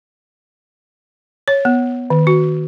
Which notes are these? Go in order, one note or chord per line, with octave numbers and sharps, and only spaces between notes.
C#5
B3
D#3
F#4